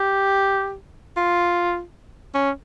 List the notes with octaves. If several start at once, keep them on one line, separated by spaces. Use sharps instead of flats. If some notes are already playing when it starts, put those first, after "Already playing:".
Already playing: G4
F4
C#4